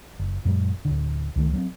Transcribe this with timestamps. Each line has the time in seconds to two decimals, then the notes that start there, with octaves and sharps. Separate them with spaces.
0.19 F#1
0.45 F#2 A#2 F#3 G#3
0.85 D1 G#1 D3
1.36 C#2 D#3 A3
1.53 F#3 B3 C4